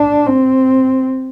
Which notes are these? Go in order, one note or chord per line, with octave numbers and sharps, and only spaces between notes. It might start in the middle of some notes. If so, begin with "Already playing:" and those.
Already playing: D4
C4